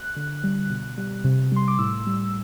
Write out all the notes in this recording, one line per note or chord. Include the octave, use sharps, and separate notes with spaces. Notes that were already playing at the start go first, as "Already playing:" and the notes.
Already playing: F#6
D3
G3
B2
G3
C3
G3 C6
D6
A2 E6
G3